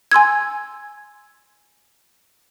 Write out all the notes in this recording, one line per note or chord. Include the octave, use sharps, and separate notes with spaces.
G#5 C6 E6 G#6